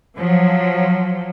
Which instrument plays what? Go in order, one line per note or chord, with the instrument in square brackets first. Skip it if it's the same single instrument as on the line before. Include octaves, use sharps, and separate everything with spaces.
[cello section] F3 F#3